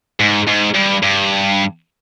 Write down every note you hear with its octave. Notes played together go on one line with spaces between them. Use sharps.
G#2
G#2
G2
G2